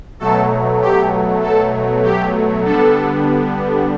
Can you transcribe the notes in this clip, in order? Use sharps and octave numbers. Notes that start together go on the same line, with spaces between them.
B2 F#3 A3 A4
G4
A4
G4
D3 G3 B3 D4 A4